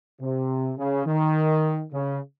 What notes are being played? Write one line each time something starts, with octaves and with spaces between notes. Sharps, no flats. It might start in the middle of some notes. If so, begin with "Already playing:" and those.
C3
C#3
D#3
C#3